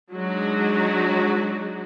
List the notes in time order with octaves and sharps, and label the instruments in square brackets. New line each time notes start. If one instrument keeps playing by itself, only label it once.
[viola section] F#3 G#3 D4 D#4 F#4